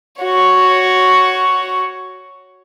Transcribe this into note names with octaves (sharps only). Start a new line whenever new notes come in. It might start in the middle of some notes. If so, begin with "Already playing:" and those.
F#4 C#5